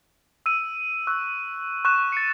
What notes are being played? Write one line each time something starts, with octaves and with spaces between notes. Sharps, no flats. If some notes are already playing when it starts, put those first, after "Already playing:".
E6 D#7
C#6 E6 F#6
C#6 F#6 E7
A6 C#7